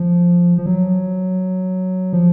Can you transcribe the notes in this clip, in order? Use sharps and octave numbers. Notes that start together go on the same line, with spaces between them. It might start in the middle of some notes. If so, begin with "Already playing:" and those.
Already playing: F3
F3
F#3
F3